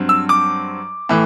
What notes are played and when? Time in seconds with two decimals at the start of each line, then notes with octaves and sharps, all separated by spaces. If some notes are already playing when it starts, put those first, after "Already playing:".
Already playing: G2 F#3 C4
0.09 E6
0.29 D6
1.09 A2 E3